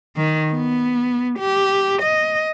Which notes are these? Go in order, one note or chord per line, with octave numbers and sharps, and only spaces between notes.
D#3
B3
G4
D#5